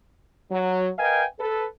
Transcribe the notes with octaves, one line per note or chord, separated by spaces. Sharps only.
F#3
A#4 B4 D#5 F5 G5 G#5
A4 B4